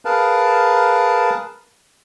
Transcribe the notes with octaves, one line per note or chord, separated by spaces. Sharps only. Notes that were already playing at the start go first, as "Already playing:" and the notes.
G#4 A#4 B4 F5 A5